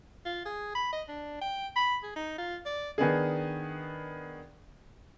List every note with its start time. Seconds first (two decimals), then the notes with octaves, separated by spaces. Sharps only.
0.25 F4
0.45 G#4
0.75 B5
0.93 D#5
1.08 D4
1.42 G5
1.76 B5
2.03 G#4
2.16 D#4
2.38 F4
2.66 D5
2.98 D#3 B3 D4 G#4